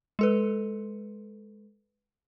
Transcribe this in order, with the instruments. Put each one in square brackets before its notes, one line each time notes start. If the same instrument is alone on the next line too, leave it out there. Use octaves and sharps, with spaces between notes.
[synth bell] G#3 A4 B4